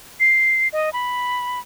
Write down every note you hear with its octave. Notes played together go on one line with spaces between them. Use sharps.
C7
D#5
B5